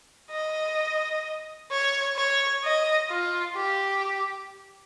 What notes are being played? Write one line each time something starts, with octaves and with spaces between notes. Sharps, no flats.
D#5
C#5
C#5
D#5
F4
G4